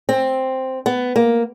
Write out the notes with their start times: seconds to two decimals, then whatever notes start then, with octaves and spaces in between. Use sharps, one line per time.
0.09 C4
0.86 B3
1.16 A#3